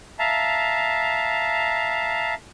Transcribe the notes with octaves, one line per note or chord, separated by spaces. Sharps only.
E5 F5 A5 A#5